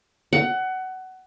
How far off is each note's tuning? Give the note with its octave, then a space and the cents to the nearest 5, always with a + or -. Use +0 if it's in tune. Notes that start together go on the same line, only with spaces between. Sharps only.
F#5 +20